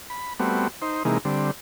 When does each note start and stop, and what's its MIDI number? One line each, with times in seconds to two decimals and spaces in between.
0.10 0.34 83
0.39 0.68 55
0.39 0.68 57
0.39 0.68 59
0.39 0.68 60
0.39 0.68 66
0.82 1.03 63
0.82 1.03 72
1.05 1.18 48
1.05 1.18 52
1.05 1.18 56
1.05 1.18 58
1.05 1.18 63
1.25 1.51 50
1.25 1.51 55
1.25 1.51 60